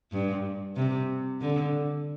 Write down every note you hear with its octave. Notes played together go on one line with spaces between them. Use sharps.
G2
C3
D3